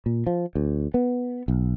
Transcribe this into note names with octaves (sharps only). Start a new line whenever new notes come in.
A#2
F3
D2
B3
B1